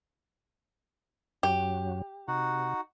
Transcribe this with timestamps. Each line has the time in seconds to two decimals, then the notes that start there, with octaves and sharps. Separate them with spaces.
1.43 F#2 F#3 G4
2.28 C3 D#4 F#4 F#5